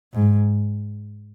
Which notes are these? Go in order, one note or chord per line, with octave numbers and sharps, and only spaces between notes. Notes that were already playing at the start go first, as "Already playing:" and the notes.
G#2